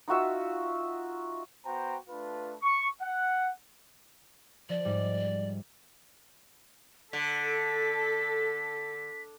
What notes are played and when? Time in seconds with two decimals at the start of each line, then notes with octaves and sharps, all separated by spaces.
0.08 D#4 F4 F#4 E5
1.65 B3 F#4 C5 G5 A#5
2.08 A3 D4 F4 B4
2.62 C#6
3.01 F#5
4.69 F3 D5
4.85 G#2 G3
7.13 D3 A4 B6